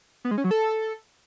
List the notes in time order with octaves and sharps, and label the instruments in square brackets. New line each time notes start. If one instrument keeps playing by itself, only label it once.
[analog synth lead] B3
G#3
C#4
F#3
A4